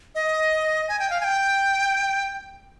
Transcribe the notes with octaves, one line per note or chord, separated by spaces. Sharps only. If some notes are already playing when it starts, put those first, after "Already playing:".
D#5
G#5
G5
F5
G#5
G5